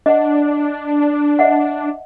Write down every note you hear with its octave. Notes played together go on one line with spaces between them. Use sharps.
D4 D#5 F#5
D#5 E5 F#5